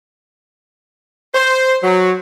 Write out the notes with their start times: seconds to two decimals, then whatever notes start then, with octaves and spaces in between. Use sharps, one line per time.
1.35 C5
1.83 F#3